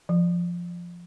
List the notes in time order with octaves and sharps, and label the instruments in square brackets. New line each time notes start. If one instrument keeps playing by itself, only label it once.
[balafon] F3